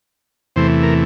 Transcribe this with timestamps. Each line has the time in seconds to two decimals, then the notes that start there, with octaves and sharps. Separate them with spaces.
0.56 E2 C3 E3 A3 C5
0.83 A#4